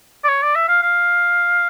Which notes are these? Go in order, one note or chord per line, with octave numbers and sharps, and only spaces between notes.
D5
C#5
D5
E5
F5
F5